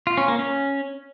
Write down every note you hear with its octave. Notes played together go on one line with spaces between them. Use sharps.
F4
C#4
A#3
C#4